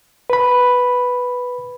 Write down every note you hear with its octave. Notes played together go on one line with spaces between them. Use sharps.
B4 B5